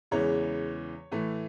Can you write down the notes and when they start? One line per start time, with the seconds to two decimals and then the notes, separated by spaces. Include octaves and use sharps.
0.11 E2 C#3 E3 G#3 C#5
1.12 A2 E3 A3